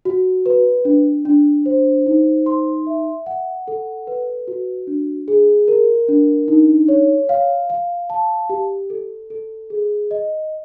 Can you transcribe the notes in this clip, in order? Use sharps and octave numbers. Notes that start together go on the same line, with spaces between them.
F#4
B4
D4
D4
C5
D#4
C6
E5
F#5
A4
B4
F#4
D4
G#4
A#4
D4
D#4
C#5
F5
F5
A5
G4
A4
A4
G#4
D#5